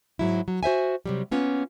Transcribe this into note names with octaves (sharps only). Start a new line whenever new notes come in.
G#2 F#3 E4
F#3
F#4 C5 E5 G#5
C3 F#3 G3
A#3 B3 C#4 F4